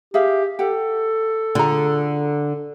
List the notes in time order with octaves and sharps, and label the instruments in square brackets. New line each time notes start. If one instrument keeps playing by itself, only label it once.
[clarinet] G4 [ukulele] G#4 E5 F5
[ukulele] G4 F#5 [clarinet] A4
[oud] D3 [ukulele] F4 G#4 A#5